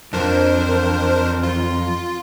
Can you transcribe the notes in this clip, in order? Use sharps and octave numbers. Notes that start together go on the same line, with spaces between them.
F2 D4 A#4 C5
F4